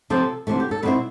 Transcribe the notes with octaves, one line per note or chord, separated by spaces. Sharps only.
C3 F3 C4 A4
D2 C3 E3 A3
G4
A4
B2 G3 C4 E4 B4